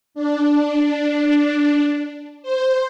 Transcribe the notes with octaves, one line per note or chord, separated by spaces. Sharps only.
D4
C5